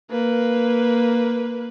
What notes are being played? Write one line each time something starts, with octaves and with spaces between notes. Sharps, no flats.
A#3 B4